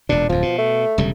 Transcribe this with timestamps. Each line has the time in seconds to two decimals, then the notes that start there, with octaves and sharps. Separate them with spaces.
0.09 E1 A#2 D4
0.29 D1 F2 F3
0.42 B2
0.58 A3
0.98 E1 C#3 G3